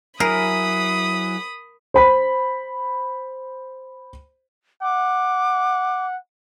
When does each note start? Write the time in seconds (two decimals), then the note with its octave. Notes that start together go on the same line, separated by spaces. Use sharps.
0.20 F#3 E4 G#4 A#4 B5 D#6
1.94 C5 B5 B6
4.82 F#5 D6